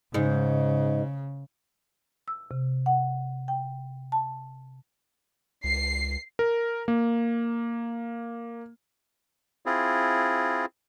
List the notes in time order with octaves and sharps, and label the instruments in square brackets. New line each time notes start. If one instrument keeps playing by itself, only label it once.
[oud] G#2 [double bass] C#3
[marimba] E6
C3
F#5
G5
A5
[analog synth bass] C#2 [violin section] C7
[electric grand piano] A#4
A#3
[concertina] C4 E4 F4 G#4